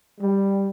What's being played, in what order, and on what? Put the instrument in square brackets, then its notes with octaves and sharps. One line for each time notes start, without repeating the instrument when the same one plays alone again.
[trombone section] G3